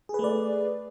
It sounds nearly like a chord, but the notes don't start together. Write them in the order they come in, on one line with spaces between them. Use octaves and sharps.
G#4 B4 A3 D5